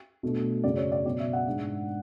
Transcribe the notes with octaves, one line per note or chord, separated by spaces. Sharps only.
B2 A3 D4
F#2 C#3 F#3 D5
C#5
D5
B2 F#3 C#4 D5
E5
F#5
G#2 G#3 D4